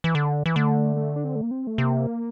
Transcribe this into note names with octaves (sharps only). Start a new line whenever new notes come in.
E3
D3
E3
D3 A3
A3
D4
C4
A3
A#3
C4
A3
C3 A#3